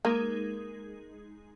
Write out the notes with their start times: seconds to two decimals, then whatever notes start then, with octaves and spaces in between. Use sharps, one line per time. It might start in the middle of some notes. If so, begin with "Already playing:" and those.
0.05 G#3 A#3 D#4 G#4